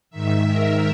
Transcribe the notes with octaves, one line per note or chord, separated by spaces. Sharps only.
G#2 D#3 E5
A#4